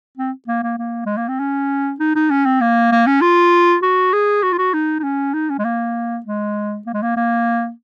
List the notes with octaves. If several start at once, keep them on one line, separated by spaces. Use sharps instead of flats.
C4
A#3
A#3
A#3
G#3
A#3
C4
C#4
D#4
D#4
C#4
C4
A#3
A#3
C#4
F4
F#4
G#4
F#4
F4
F#4
D#4
D#4
C#4
D#4
C#4
G#3
A#3
G#3
A#3
G#3
A#3
A#3